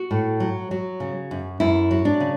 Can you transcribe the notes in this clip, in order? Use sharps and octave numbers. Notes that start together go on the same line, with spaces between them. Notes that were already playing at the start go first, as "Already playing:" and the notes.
Already playing: F#4
A2
F#3
F#3
C#3
F#2
F#2 E4
F#3
D4
C#3